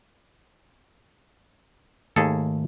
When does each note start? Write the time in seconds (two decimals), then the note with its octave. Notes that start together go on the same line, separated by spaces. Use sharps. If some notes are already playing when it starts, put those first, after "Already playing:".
2.16 D#2 G#2 D#3 A3 G#4 A4